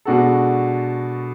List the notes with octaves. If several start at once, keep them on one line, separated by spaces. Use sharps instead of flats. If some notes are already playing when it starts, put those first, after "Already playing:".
B2 G#3 D4 F#4 A4